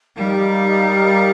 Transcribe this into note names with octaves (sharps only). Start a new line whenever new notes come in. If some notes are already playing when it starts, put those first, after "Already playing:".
G3 D#4 G4 A#4 F5